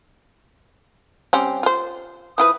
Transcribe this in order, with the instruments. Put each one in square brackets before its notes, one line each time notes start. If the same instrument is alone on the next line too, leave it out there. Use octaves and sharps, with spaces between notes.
[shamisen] G3 C4 C#4
F4 C5
[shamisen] F3 E4 B4 [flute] D#6